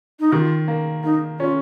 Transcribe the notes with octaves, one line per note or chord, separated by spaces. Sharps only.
D#4
D#3 F4 G4
A#3
A#3 D#4
C#4 F4